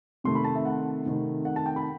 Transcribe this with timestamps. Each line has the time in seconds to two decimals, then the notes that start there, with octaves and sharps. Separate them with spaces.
0.24 C3 D#3 A3 C6
0.35 B5
0.44 A5
0.55 E5
0.65 F#5
1.06 C3 D#3 A3
1.45 F#5
1.56 A5
1.66 G5
1.76 B5